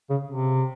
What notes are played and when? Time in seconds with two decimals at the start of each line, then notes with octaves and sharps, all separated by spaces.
0.10 C#3
0.31 C3